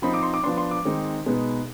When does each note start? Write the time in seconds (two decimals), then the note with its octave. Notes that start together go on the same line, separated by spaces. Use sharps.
0.02 F3 C4 D#4 B5
0.14 D6
0.23 C6
0.34 D6
0.44 F3 B3 D4 C6
0.57 C6
0.71 D6
0.85 D#3 G#3 C4 D#4
1.26 B2 G#3 B3 D#4